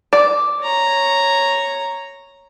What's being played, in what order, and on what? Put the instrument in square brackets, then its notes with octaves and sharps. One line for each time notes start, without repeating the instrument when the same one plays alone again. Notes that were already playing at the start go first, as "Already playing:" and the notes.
[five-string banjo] D5
[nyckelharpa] C#5 A#5